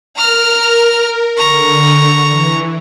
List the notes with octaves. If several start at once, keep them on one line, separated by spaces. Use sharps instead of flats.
A#4 A#5 F6
D3 A#5 C#6
E3